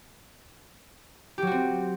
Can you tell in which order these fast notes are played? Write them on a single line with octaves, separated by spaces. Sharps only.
G4 F#3 F#4 C4